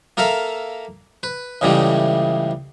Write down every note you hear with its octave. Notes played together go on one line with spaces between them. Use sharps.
A#3 A4 A#4 E5 F5
B4
C#2 A2 C#3 E3 G3 A3